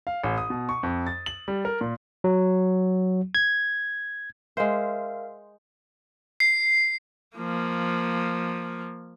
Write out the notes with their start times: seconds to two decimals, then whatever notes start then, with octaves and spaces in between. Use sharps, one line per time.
0.07 F5
0.24 A1
0.38 D#6
0.50 B2
0.69 C#6
0.83 F2
1.07 A6
1.26 F#7
1.48 G3
1.65 A#4
1.81 A#2
2.24 F#3
3.35 G#6
4.57 G#3 A#4 C5 E5 F5
6.40 C7
7.37 F3 A#3